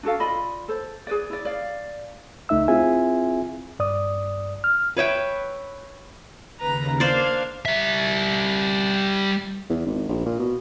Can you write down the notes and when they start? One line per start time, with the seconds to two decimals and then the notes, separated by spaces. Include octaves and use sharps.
0.03 D4 F#4 A4 F5
0.20 F4 D5 D#5 B5
0.68 A4 C5
1.07 G#4 B4 D5
1.30 E4 D5
1.45 D5 F5
2.49 C#2 A3 D#4 E5 E6
2.68 C4 E4 F4 G#4 E5 G#5
3.79 G2 D5 D#6
4.64 F6
4.97 B4 C#5 E5 G5
6.59 D#2 C#3 B4 A#5
7.00 A#3 D4 C5 D5 F5 G#6
7.65 G3 E5
9.70 E2
9.86 G#1
10.09 A#1
10.26 A#2
10.39 B2